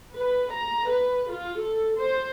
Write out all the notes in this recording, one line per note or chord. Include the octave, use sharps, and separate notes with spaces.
B4
A#5
B4
F4
A4
C5